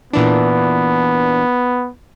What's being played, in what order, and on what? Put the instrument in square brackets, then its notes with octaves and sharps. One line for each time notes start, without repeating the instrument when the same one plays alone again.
[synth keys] A#2 E3 D4 [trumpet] B3